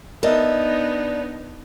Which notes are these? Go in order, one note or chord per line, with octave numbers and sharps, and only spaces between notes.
B3 D4 D#4 A#4 D#5 E5